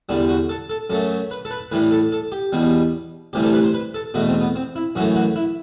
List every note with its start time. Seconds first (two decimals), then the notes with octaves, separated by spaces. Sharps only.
0.09 E2 D3 G3 D4
0.29 F#4
0.49 A4
0.70 A4
0.90 F#2 F#3 A3 A4
1.31 B4
1.45 A4
1.51 B4
1.72 A2 E3 G3 B4
1.91 A4
2.12 A4
2.32 G4
2.52 E2 B2 G3
3.33 D2 C3 E3 G3 G4
3.43 A4
3.53 B4
3.64 C5
3.74 B4
3.94 A4
4.14 E2 B2 A3 F#4
4.28 C4
4.41 B3
4.55 C4
4.76 E4
4.95 F#2 E3 A3 F#4
5.16 F#4
5.36 E4